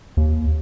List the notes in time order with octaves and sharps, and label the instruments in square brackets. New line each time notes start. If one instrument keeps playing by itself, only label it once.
[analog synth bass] D#2